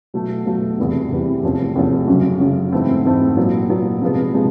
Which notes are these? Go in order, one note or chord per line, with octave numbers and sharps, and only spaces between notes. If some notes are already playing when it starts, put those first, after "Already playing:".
B2 F#3 A3
B2 F#3 A3
E2 C3 E3 G3
E2 C3 E3 G3
E2 C3 F3 A3 C#4
E2 C3 F3 A3 C#4
F#2 C#3 F#3
F#2 C#3 F#3
G#2 E3 A3 C4
G#2 E3 A3 C4
A#2 F#3 B3
A#2 F#3 B3
C3 F3 G#3 B3
C3 F3 G#3 B3